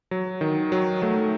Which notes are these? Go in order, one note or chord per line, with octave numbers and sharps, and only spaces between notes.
F#3
D#3
F#3
F#3 A3